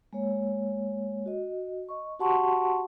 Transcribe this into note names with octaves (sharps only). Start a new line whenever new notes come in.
G#3 A#3 C#5
F#4 D#5
D#5 C#6
F#4 G4 F#5 A5 C6 C#6